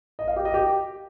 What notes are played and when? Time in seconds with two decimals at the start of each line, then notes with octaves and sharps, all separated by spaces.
0.19 D#5
0.28 F5
0.36 G4
0.45 D#5
0.54 G4